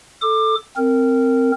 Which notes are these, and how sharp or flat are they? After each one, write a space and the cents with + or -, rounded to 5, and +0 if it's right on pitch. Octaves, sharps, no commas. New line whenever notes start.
A4 +0 D6 +20
C4 +0 A#4 -15